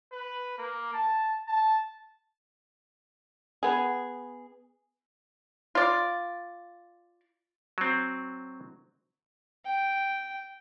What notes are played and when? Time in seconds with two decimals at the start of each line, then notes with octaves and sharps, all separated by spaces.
0.12 B4
0.58 A#3
0.94 A5
1.48 A5
3.63 B3 G#4
5.75 F4 D5
7.78 F#3 C4
9.65 G5